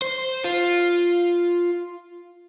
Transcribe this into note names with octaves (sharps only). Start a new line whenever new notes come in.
C5
F4